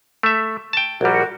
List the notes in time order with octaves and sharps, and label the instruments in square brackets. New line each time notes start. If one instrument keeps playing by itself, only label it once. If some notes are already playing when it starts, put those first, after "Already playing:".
[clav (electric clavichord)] A3 E5
G5 A5
[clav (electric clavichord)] A#1 G3 [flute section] F#4 A#4